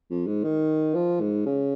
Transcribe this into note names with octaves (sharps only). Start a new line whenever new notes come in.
F2
G#2
D#3
F3
G#2
C#3